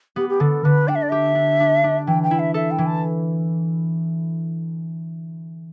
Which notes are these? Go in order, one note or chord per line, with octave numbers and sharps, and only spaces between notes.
B3 G4
G4
D3 A4
D3 B4
D4 G5
E5
D5
G4 E5
D4
D4
D4
E3 G5
G5
E4
E5
A4 E5
G5
E3
A5